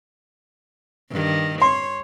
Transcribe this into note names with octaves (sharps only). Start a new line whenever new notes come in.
G2 D#3
C#5 C6